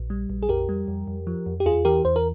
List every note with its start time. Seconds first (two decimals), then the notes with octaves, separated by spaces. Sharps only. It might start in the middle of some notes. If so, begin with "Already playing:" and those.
Already playing: A#1
0.10 G3
0.30 A#1
0.43 G#4
0.49 F2 G4 A#4
0.69 G3
0.88 F2
1.08 F2
1.27 F3
1.46 F2
1.60 G4
1.66 E2 F4 G#4
1.85 E3 G4 A#4
2.05 E2 C5
2.16 A#4